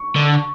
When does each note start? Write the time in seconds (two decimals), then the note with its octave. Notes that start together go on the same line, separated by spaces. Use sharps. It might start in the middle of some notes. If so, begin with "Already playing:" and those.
Already playing: C#6
0.16 D3